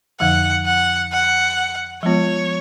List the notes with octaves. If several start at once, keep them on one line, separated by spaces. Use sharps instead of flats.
F2 D3 F3 F#5
F#5
F#5
F3 G#3 B3 F4 C#5